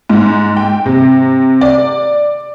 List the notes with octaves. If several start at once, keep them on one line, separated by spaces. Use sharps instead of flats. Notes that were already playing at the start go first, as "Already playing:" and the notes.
G#2
G5
C3
D5